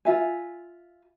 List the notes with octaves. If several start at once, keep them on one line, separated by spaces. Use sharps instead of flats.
F4 E5 G#5